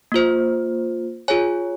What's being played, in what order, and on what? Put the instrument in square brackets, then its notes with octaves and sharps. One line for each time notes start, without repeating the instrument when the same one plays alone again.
[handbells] A#3 F4 C5
F4 G#4 C#5 G#5